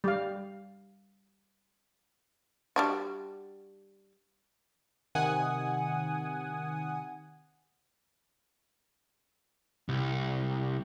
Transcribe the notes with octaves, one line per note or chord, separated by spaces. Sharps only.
G3 F5
G3 D4 F#4
C3 D#3 F#5 G#5 D#6
C2